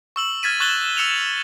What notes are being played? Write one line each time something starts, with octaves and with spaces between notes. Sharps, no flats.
C#6 E6 F#7
F6 G#6 A6 B6 D#7
C#6 F#6 A6 E7 F#7 G7
E6 C#7 D#7 F7